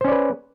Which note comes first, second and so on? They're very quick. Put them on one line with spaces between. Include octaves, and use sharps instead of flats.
C5 C#4 D5 B4